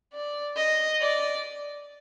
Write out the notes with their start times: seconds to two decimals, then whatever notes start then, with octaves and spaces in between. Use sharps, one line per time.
0.13 D5
0.57 D#5
1.01 D5